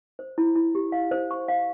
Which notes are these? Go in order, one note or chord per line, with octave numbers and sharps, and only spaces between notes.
C5
E4
E4
G4
F5
C5
C#6
F5